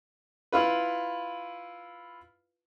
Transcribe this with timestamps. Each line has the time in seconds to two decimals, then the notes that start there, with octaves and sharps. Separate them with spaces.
0.52 E4 F4 B4